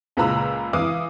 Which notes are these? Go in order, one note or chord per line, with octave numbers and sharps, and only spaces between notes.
C#2 A#2 B4 A#5 B5 E6
E3 E4 F5 D6 D#6